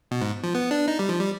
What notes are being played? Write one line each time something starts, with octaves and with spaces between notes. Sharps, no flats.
B2
G#2
F3
B3
D4
D#4
G3
F3
G3